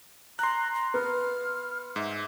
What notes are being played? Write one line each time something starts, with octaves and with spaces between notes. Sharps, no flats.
A#5 C6 F#6
A#5
B3 F6
G#2 E5